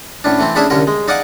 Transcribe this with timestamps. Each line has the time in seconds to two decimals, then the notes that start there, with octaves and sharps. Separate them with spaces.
0.24 A2 C#4 D4
0.39 E3 A3 C4
0.55 A3 C#4 D4 E4 G#4 E5
0.70 C2 D3 C#4 A#4
0.87 G#3
1.08 D#4 D5 F5 F#5 G#5 D6